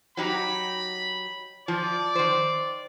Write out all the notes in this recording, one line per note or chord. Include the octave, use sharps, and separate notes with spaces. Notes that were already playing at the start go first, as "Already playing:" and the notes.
F#3 D#4 G4 B5
F3 D5
D#3 C5